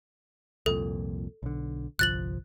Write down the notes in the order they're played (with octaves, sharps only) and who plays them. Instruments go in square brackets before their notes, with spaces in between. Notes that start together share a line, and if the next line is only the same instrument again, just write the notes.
[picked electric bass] C2 F2 A#2 [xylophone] A4
[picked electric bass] B1 D3
[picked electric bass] G1 C2 F3 [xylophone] F#6 A6 F#7